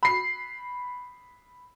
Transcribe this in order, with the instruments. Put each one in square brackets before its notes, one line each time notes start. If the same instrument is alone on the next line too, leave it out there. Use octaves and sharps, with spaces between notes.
[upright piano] B5 C7